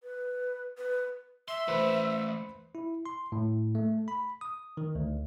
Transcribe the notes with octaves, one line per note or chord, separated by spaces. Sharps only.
B4
B4
E5 C6
E3 A3 B4 C5
E4
C6
A2
A3
B5
D#6
D#3
D2